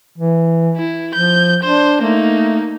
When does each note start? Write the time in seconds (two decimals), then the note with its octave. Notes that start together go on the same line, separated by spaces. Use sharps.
0.18 E3
0.77 E4
1.14 F3 G6
1.63 D4 C5
2.01 A3 A#3 D#4